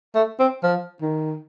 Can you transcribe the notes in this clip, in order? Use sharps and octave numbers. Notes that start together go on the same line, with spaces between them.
A3
C4
F3
D#3